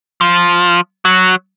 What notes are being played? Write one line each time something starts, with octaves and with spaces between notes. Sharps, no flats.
F3
F#3